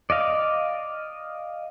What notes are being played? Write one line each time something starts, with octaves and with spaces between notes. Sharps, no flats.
D5 D#5 F5